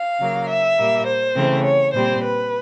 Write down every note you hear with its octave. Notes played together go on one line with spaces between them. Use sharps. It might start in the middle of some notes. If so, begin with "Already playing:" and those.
Already playing: F5
C#3 F#3 A#3
E5
A#2 G3 A#3
C5
C#3 E3 A3 C4
C#5
A#2 G3 C4 C5
B4